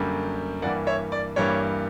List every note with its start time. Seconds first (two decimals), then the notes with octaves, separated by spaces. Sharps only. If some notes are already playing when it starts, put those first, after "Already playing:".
Already playing: F#2 D3 G3 A#3
0.62 G2 E3 G3 A#3 D5 F#5
0.87 C#5 E5
1.12 D5
1.36 G2 E3 G3 A#3 C#5